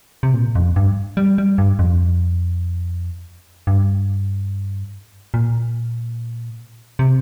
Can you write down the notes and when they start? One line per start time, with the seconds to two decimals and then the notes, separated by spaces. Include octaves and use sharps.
0.23 C3
0.34 A#2
0.55 F2
0.76 G2
1.17 G3
1.38 G3
1.58 G2
1.79 F2
3.67 G2
5.34 A#2
6.99 C3